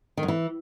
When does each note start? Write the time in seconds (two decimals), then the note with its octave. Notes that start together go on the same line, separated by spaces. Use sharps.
0.17 D#3
0.23 F#2
0.28 E3